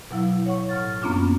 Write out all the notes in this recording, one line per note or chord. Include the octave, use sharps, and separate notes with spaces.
B2 F#3 E4 F5
C#5 F#5 C#6
A2 F6 A6
F#2 A#3 B3 C#4 D4 F4